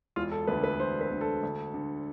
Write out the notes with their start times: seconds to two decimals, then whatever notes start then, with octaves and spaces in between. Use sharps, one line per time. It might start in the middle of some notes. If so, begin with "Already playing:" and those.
0.16 E1 F4
0.31 A4
0.47 D2 D3 B4
0.64 B4
0.80 E1 C5
1.01 B4
1.11 D2 D3
1.21 A4
1.43 D2
1.74 D3